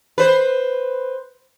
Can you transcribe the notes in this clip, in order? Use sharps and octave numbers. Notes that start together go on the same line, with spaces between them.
B4 C5